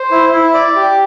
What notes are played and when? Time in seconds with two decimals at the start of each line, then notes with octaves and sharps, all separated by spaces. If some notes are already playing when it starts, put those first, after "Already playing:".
Already playing: C5
0.11 E4
0.33 E4
0.54 D5
0.76 G4